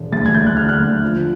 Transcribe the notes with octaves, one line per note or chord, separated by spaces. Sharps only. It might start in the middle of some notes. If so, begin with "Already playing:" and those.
Already playing: E1
D2 A6
G#6
D2 G6
F#6
D3 F6
F#6
D2
F3